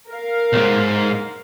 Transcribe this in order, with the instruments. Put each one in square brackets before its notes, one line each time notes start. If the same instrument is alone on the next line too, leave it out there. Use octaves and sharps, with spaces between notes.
[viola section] A#4 F5
[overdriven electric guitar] B1 G#2